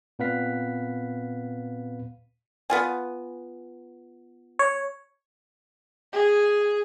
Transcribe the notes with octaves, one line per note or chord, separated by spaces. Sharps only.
A#2 B3 C4 B4 F5 B6
B3 F4 G#5
C#5
G#4